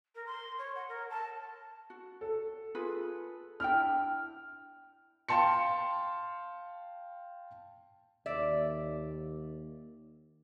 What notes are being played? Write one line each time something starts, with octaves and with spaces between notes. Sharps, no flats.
A#4
C6
C#5
F#5
A#4
A5
F#4
A4
F4 G#4 B4
D4 E4 G5 F6
F5 G5 A5 C6 C#7
D#2 D5 E5